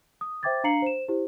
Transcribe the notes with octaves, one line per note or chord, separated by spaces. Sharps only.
D#6
C5 E5 G5 D6 G#6 A6
D4 F5 A#5 C7 C#7 F#7
C5 E7
E4 G4 C5